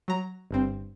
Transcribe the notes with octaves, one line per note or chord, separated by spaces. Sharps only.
F#3 A#5
G1 G2 C4